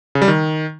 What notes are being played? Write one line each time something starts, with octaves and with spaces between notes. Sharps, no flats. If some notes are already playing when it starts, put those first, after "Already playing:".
C#3
G3
D#3